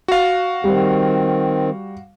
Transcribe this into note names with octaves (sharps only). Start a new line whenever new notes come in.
F#4 F5
D#3 G3 C4